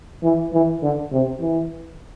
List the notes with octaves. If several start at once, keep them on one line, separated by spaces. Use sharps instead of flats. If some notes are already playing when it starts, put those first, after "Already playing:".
E3
E3
D3
C3
E3